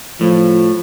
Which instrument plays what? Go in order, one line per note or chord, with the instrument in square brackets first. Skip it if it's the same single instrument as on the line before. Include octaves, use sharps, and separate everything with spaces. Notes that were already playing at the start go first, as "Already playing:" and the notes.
[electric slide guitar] A2 [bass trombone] F3